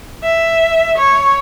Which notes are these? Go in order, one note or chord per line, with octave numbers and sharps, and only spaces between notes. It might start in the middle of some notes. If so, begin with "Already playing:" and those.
E5
C#5